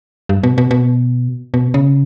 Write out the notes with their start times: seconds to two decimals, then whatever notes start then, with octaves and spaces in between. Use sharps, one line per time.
0.29 G2
0.43 B2
0.58 B2
0.71 B2
1.54 B2
1.74 C#3